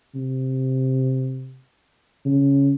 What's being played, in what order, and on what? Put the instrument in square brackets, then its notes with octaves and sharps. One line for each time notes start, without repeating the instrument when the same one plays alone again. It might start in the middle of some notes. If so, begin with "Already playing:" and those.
[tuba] C3
C#3